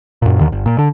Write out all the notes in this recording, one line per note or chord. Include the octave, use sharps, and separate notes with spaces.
F#2 A#2
D#2 D3 D#3
G1
A#2
D3